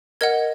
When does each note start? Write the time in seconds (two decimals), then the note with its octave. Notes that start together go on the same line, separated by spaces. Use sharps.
0.21 A#4 D#5 F#5 G#6